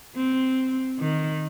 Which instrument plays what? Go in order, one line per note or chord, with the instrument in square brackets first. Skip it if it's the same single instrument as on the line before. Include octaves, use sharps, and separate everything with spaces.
[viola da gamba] C4
D#3